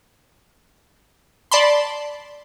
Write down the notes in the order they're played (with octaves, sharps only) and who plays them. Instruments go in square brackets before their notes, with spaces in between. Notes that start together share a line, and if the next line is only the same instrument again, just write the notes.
[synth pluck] D5 A5 B5 C6